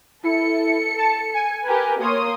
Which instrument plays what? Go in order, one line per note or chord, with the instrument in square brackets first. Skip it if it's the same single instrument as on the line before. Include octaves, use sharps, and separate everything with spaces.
[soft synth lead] E4 [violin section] A4 C#7
[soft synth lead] A5
G#5
[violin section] G4 A#4 B4
[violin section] A#3 C6 D#6 [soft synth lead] C#5